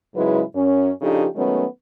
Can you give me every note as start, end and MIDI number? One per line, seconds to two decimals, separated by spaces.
0.15 0.41 44
0.15 0.41 49
0.15 0.41 54
0.15 0.41 56
0.15 0.41 64
0.15 0.41 71
0.55 0.90 42
0.55 0.90 61
1.01 1.26 49
1.01 1.26 53
1.01 1.26 62
1.01 1.26 63
1.01 1.26 67
1.01 1.26 69
1.35 1.63 51
1.35 1.63 54
1.35 1.63 56
1.35 1.63 57
1.35 1.63 59
1.35 1.63 61